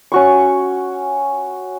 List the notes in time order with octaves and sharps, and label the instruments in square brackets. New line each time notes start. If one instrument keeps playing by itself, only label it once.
[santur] C#4 F#4 C#6